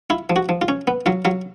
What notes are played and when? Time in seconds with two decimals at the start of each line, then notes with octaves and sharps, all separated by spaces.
0.10 E4 F4
0.30 F3
0.36 F#4
0.49 F3
0.62 F4
0.68 C#4
0.87 B3
1.06 F#3 F4
1.25 F#3 F4